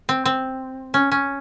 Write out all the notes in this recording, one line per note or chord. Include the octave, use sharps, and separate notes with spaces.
C4
C4
C#4
C#4